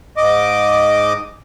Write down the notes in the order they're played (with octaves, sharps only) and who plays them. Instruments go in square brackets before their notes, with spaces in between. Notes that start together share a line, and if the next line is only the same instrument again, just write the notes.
[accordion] G#2 D#5 D6